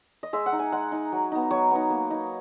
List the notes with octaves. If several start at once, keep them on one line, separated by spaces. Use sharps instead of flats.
D#5
G#3 E5
F#5
D#4
G#5
G#3 F#5
D#4
F#3
B3 D#4
F#3 C#5
B3 D#4
A#3
D#4